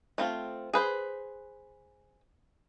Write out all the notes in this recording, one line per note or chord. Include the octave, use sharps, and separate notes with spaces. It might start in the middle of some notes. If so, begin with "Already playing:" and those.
A3 C4 F4
G#4 B4 C5